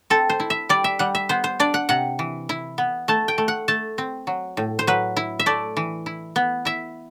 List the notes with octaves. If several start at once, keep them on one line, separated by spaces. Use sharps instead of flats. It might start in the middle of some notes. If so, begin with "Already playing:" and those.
C4 A4
C5
E4
E5
G3 D5
E5
G3 F#5
E5
B3 C5
C5
D4 D5
F#5
C3 F#5
E3
E4
B3
A3 A5
G5
A3
F#5
A3 A5
C4
F#3
A2
C5
F#3 B4
E4
E5
A3 D5
E3
E4
B3
E4 E5